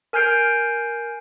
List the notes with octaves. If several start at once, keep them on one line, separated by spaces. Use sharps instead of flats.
A#4 G#5 F6 G6 C7 D7